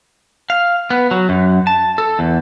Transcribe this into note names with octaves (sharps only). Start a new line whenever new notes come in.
F5
B3
F#3
F#2
A5
A4
E2